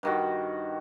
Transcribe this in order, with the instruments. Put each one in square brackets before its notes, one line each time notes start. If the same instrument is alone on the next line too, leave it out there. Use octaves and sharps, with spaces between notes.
[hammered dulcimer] G2 D#3 F#4